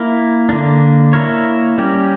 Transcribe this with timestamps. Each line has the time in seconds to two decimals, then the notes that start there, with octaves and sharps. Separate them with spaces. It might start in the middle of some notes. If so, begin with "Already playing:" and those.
Already playing: A#3 E4 A#4
0.49 D3 A#3 D4
1.13 A#3 E4 A#4 C#5
1.78 G3 C#4 G4 A#4